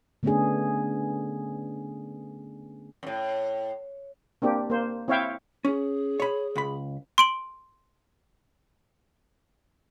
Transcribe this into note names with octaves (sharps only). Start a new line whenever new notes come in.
D3 A3 B3 C#4 D4 G#4
F#2 A2
A#3 C4 D4 G4
A#3 C5
C4 E4 C#5 E5 F5 G5
C#4 G#4
C#5 B5
C#2 B5
C6 D7 F#7